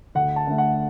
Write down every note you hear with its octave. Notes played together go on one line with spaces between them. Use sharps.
D2 F#5
A5
D3 A3
F#5